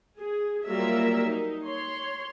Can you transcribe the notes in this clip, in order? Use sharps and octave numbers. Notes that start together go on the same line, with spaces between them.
G#4
F#3 G3 A#3 F4 A#4 E5
D#4
C#5 C6